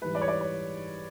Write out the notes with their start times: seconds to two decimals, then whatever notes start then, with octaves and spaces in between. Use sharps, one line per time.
0.02 G#2 E3 G3 B4
0.15 D5
0.21 C#5
0.28 D5
0.41 C#5